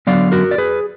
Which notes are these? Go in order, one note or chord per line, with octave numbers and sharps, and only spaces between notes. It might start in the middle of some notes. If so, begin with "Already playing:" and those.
D3 F#3 B3 D5 F5
F#4 A#4
D5
G#4 B4